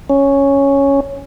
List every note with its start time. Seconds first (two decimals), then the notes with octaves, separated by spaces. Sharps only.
0.10 C#4